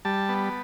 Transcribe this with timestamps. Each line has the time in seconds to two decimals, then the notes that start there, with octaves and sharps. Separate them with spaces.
0.05 G3 A5
0.29 B3